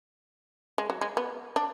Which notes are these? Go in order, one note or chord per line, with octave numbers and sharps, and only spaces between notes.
G#3
F#3
G#3
B3
D4